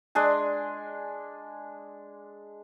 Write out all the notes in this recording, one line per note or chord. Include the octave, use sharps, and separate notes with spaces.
G#3 D4 G#5